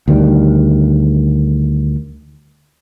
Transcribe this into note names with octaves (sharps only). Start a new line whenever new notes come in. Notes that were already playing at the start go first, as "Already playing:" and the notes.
D2 D#3 G3